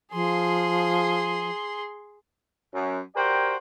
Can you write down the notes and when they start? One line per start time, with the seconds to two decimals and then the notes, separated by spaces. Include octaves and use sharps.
0.13 F3 G#4 C6
2.73 F#2
3.16 F#4 G4 A#4 C5 D5 G5